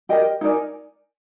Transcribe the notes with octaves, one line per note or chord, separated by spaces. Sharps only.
G4 A#4 D#5 G5
D#4 A#4 D5 G#5